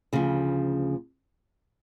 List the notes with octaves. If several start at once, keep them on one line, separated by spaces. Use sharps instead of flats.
D2 C#3 F3